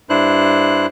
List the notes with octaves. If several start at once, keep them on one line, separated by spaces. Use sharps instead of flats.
G2 D4 E4 C5 F#6